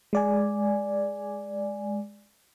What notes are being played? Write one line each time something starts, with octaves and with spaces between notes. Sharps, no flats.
G#3 D5 G#5